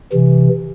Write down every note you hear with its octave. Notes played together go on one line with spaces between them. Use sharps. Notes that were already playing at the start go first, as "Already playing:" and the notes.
C3 E3